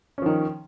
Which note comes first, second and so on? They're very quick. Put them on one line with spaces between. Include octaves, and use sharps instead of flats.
C#4 F3 D#3